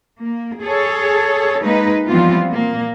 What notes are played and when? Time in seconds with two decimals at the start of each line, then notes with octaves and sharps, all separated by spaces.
0.21 A#3
0.62 G#4 A4 C#5
1.63 G#3 A#3 D#4 B4
2.07 E3 F3 G3 B3 C4 F4
2.50 A#2 A#3